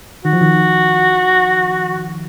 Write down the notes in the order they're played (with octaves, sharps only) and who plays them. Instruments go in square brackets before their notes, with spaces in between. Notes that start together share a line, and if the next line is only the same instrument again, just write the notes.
[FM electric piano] D#3 [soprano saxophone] F#4
[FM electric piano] F3
D#3